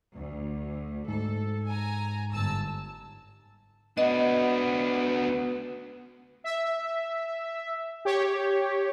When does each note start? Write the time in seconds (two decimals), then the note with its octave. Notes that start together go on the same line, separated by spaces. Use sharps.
0.14 D2
1.08 G#2 A4
1.67 G#5 A#5
2.33 G1 A5 E6
3.98 B3 D4 F#4 D#5
6.44 E5
8.05 G4 C#5